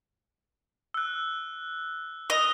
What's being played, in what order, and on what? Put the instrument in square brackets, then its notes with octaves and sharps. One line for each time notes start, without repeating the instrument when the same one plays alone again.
[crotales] E6 F#6
[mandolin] D#5 [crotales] A#6 F7 G7